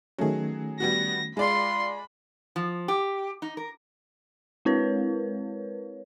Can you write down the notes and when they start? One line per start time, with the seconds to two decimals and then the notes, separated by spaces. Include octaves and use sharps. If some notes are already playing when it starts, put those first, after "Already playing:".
0.18 D#3 F#3 A3 C#4 G#4
0.80 G3 B3 F#4 A#6
1.37 G#3 F4 D5 B5 C6
2.56 F3
2.88 G4
3.42 D#4
3.57 A#4
4.65 G#3 C4 E4 A#4 B4 C#5